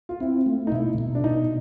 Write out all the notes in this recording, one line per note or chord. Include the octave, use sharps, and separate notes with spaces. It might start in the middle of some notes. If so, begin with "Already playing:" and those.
F4
C4 E4
A3
D#4
B2 E4
B2
D4
B2 D#4